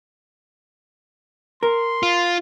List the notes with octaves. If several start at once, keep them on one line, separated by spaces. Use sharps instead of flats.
A#4 C6
F4